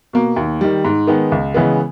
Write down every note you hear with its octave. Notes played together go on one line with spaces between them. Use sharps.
B2 A#3
D#2
D#3 G3
G#2
D#3 G#3 B3
C#2
C#3 E3 G#3 B3